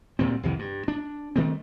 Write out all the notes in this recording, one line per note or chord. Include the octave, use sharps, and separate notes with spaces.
D2 A#2 G3 C4
C2 F2 D#3 E3
G2
D4
D#3 G3 A3 C4